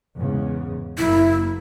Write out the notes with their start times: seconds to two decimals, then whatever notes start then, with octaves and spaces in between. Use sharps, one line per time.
0.16 E2 G#2 C#3
0.98 F#1 A#3 E4